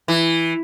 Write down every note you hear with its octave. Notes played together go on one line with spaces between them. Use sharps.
E3